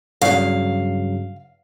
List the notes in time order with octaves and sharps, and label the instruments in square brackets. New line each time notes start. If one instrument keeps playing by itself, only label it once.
[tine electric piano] G2 C#3 F#3 [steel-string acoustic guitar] F5